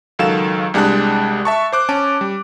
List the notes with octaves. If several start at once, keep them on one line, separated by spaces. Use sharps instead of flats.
C#2 D#3 F#3 A4 F5 E7
C2 G3 G#3 D4 A5 F#6
E5 A5 C#6
C5 D6 F#6
C#4 A5 D7
G3